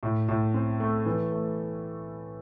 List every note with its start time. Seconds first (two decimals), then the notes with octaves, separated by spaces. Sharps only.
0.03 A2
0.28 A2
0.54 C4
0.80 A3
1.06 E3
1.32 A3